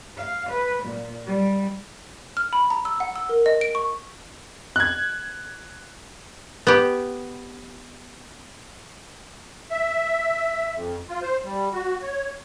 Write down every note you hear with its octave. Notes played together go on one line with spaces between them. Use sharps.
F5
B4
A#2
G3
F6
B5
A#5
E6
F#5
E6
A#4
D#5
D7
C#6
F#6 G#6
B3 G4
E5
F2
F4
C5
G3
F#4
C#5